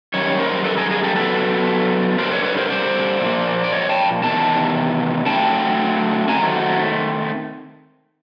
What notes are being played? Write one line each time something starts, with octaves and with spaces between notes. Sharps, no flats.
F#2 D#3 G3 C#5
A#4 C5
A4 B4
G#4 A#4
G#4 A#4
G4 A4
D3 F#3 B3 D4 A4 B4
G2 D3 G3 A#4 C5
B4 C#5
B4 C#5
A#4 C5
C5 D5
A#2 F3 A#3
D5
C#5 D#5
G5 A5
E2 C3 D#3 A5
D3 F#3 A3 C4 G5 A5
D#3 F#3 A3 C4 G#5 A#5